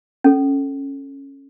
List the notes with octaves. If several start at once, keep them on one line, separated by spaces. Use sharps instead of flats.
C#4 A4